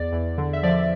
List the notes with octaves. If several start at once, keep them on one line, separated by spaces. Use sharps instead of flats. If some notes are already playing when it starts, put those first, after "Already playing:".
Already playing: E2 D5
E2
D3
E5
F3 D5